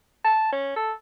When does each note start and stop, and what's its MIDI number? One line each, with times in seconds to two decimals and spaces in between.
0.25 0.50 81
0.52 0.73 61
0.76 0.92 69